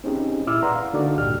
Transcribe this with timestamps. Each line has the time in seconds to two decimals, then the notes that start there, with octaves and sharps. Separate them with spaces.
0.04 C4 C#4 D#4 G4 G#4
0.47 A#2 E4 D6 E6 F6
0.62 B4 D5 F#5 A#5 C6
0.75 F5
0.93 D3 D4 D#4 F#4 A4 D5
1.18 C#2 G2 A#2 G4 F6